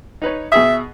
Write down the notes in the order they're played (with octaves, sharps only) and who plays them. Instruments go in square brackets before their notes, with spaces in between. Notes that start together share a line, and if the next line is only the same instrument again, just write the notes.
[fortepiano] D#4 B4 C#5
[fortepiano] B2 G#4 D#6 [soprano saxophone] E5